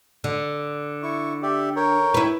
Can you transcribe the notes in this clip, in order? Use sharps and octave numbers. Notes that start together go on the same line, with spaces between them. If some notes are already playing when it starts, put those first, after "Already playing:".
D3
E4 C#6
G4 D5 E5
A#4 C#5 G5
E4 B4